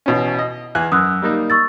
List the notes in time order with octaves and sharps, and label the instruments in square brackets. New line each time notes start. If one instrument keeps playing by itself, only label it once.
[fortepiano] A1 B2 C#4
D#5
E2 G#5 F#6
[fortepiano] F#2 [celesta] D#6 E6 F#6
[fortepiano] G3 A#3 D#4
[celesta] C#6 E6 A6